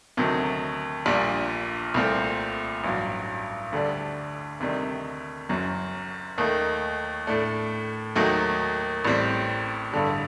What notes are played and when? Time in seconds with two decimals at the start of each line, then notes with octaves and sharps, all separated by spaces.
0.17 D2 C3 D#3 F#3
1.06 A#1 A#2 G3 D4
1.94 C2 A#2 A3 C4
2.84 A1 G2 F#3
3.72 D2 D3 G3 D4
4.60 D2 C3 D#3 G3
5.49 F#1 F#2 F#3
6.38 D#2 D#3 A3 D#4
7.27 A2 A3 D4
8.16 D#2 D#3 F#3 A3
9.05 A1 A2 G3 C4
9.92 A1 G2 D3 G3